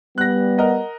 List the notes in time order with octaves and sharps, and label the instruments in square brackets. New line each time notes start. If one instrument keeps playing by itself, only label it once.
[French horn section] G3 B3 [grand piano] F#6 A#6
[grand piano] A#4 D#5 F#5